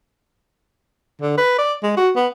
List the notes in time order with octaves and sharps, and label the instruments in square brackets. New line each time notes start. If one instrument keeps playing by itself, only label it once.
[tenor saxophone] D3
B4
D5
G#3
F#4
B3